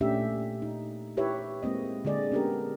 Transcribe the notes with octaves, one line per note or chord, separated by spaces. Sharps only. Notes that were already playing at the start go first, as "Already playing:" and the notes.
A#2 A3 C#4 D4 G4 E5
D#4
E4 G4 B4 C#5 E5
G#3 A#3 C4 D#5
D3 G#3 G#4 D5 D#5
B3 C#4 D4 G4 A4 A#4